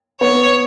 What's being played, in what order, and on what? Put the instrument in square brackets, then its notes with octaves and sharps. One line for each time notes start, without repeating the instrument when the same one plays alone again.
[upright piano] B3 [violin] C#5